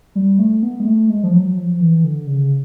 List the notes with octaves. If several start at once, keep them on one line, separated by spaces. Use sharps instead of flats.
G3
A3
B3
G#3
A3
G#3
F3
F#3
F3
E3
D3
C#3